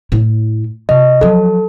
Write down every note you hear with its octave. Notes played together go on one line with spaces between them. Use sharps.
A2 E4
C3 D#5
F3 F#3 A4